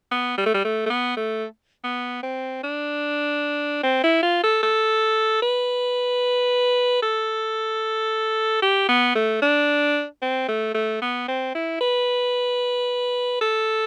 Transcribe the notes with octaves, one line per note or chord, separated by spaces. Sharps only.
B3
G3
A3
G3
A3
A3
B3
A3
B3
C4
D4
C4
E4
F4
A4
A4
B4
A4
G4
B3
A3
D4
C4
A3
A3
B3
C4
E4
B4
A4